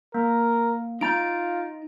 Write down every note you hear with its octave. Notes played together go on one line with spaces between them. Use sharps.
A#3 A#4
D#4 F4 A#5 G6 A6 D7